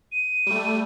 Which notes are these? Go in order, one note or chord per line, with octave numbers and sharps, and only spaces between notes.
D#7
G3 A3